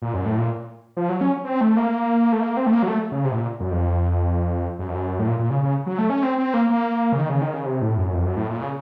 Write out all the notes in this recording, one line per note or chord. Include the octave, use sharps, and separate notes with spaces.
A#2
F#2
A2
A#2
F3
F#3
C#4
C4
A3
A#3
A3
A#3
C4
A3
A#3
F#3
A3
C#3
C3
A2
A#2
F#2
F2
F#2
F2
F#2
A2
A#2
A#2
C#3
C#3
F#3
A3
C#4
C4
C4
A#3
A#3
C#3
D#3
C#3
D#3
C#3
C3
A2
F#2
F2
F#2
A2
A#2
C#3